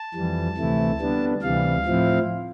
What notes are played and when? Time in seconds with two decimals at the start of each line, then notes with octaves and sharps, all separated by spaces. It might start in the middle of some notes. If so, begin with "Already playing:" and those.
Already playing: A5
0.14 F2 E3 G3
0.57 D2 C3 E3 A3 E4
1.00 D3 G3 B3 D4
1.42 D2 C3 E3 G3 F5
1.85 A2 F3 C4 E4